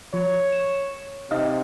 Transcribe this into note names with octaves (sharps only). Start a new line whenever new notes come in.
F3 C#5
E7
C3 D#4 D#5 F5